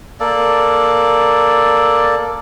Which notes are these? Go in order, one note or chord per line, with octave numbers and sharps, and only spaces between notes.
A#3 A4 D5